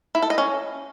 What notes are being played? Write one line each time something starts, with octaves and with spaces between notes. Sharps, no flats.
E4
A4
D#5
C#4